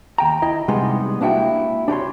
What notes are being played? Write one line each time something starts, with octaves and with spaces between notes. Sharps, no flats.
D#2 G5 A#5
E4 D#5
C3 G3 G#3 B3 D#4 C6
A#3 D4 E4 F#4 G5
D4 G4 C#5 C6